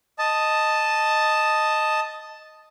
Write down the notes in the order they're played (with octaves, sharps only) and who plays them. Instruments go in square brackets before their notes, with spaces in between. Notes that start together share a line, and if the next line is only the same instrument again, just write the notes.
[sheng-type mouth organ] D#5 A5